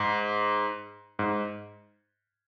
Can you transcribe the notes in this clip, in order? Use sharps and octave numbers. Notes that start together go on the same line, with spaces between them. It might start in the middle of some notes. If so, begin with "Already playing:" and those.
Already playing: G#2
G#2